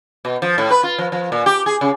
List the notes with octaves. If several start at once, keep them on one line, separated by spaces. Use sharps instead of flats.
B2
F3
A2
B4
F4
F3
F3
A#2
G4
G#4
C#3